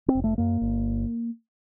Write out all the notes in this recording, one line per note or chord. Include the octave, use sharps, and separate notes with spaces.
C4
F1
A3
F#2 A#3
G1